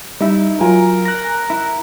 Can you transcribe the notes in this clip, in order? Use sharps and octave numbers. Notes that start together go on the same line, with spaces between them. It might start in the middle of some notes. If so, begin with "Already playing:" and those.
G3 D#4 E4 E5
F#3 F4 A#4 G#5
F#6 A#6
E4